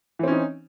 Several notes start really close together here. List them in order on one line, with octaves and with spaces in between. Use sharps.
E3 C4 C#4 D#4